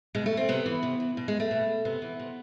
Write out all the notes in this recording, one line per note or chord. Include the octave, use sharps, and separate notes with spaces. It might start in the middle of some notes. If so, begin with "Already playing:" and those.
B2 G#3
A3
C4
C3 B3
E3
C3
E3
B2
G#3
A3
B2
C3 B3
E3
C3